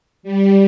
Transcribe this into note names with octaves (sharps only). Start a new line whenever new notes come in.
G3